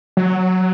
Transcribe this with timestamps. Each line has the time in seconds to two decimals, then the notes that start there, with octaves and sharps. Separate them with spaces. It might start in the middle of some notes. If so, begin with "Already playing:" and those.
0.17 F#3